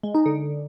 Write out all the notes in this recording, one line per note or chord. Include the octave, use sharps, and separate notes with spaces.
G#3
D#4
D3